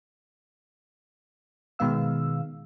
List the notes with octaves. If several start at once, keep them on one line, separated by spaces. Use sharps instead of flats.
B2 D#3 G#3 B3 F5 E6